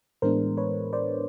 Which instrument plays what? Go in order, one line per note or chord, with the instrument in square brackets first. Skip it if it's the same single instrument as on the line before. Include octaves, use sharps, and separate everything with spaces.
[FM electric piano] A2 E3 G#3 B3 D4 A#4 C5
B4 C#5
C5 D5